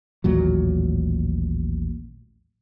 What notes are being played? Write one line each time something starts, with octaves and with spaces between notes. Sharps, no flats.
A1 D#2 A#2 F#3